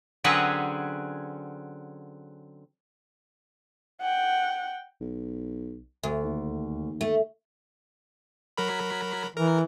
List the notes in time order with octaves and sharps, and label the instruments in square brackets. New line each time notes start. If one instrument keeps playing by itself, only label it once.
[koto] D3 F#3 C4 C#4 G#4 B4
[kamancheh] F#5 G5
[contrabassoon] B1
[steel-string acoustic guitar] D2
[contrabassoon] D#2
[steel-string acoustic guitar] A3
[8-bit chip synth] F#3 A#4 B5
[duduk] E3 [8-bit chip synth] A#4